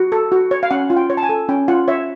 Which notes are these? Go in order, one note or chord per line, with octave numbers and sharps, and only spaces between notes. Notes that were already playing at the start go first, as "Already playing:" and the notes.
Already playing: F#4
A4
F#4
C#5
F5
C#4 F#5
F4
G5
C#5
A5
G#5
A4
C#4 G5
F4 F#5
C#5 E5